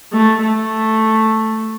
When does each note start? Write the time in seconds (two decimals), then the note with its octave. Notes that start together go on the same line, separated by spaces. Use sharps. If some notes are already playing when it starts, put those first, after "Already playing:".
0.12 A3
0.42 A3